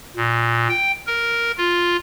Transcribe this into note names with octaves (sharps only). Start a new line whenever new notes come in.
A#2
G5
A#4
F4